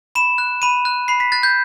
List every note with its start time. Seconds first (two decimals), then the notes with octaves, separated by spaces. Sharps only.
0.15 B5 E7
0.38 F#6
0.62 B5 D#7
0.85 F#6
1.08 B5 C7
1.20 B6
1.32 F#6 A6
1.43 G6